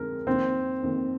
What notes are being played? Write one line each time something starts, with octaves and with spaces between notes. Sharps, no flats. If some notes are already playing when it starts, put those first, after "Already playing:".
Already playing: F2 D3 G#3 D#4 A#4
F2 D#3 A#3 C4
F2 D#3 A#3